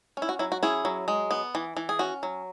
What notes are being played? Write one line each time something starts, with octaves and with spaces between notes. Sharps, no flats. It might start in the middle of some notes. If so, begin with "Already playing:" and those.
C#4
E4
F#4
F#3 E4
F#4
C#4 E4 G#4
F#3
G#3
B3
E3
E3
G#4
C#4 F#4
F#3